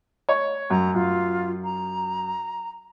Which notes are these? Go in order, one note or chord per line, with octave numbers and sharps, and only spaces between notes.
C#5
F#2 A#5
F#2 F4
A#5